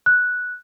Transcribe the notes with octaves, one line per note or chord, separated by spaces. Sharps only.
F#6